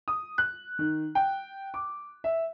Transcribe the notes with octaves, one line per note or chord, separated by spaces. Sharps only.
D#6
F#6
D#3
G5
D6
E5